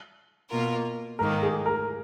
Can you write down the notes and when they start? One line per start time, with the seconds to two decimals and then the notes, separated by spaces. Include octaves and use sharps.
0.48 B2 A#3 F4 A#4
1.19 G#2 D#3 A#3 A#4
1.42 G#4
1.66 A#4